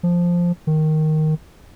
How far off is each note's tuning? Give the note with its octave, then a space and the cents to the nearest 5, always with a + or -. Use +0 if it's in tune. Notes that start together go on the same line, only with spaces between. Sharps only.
F3 +0
D#3 +0